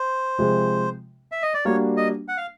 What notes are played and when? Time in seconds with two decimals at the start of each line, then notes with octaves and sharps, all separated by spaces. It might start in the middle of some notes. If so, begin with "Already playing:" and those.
Already playing: C5
0.38 C3 F3 G#3
1.32 E5
1.42 D#5
1.54 D5
1.65 G3 A#3 D4 F#4 C#5
1.97 D#5
2.28 F#5
2.37 F5